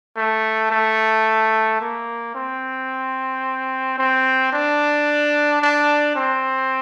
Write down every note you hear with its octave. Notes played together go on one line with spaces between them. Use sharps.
A3
A3
A#3
C4
C4
D4
D4
C4